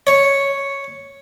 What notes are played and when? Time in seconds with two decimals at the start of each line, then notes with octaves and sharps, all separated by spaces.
0.07 C#5